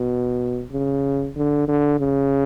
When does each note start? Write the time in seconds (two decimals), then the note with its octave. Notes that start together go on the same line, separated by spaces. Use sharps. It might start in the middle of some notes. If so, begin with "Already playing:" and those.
Already playing: B2
0.72 C#3
1.36 D3
1.68 D3
2.00 C#3